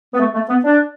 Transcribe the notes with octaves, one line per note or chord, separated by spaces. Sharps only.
B3
A3
A3
B3
D4